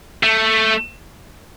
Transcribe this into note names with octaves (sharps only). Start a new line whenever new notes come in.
A3